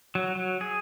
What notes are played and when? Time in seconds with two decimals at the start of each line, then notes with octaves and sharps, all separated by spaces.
0.15 F#3
0.35 F#3
0.61 G#4